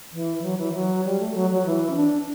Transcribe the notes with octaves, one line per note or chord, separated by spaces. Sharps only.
E3
F#3
E3
F#3
G3
A3
F#3
F#3
E3
C#4
D4